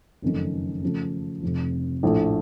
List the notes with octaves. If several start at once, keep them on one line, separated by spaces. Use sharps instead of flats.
F#1 F2 D#3 A3 C#4
C#3 F3 A3
F1 F2 C3
A#1 A2 A3